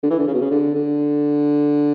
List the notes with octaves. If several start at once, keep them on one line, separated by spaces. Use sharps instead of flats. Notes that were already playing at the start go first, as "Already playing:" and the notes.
D3
E3
D3
C#3
B2
C#3
D3
D3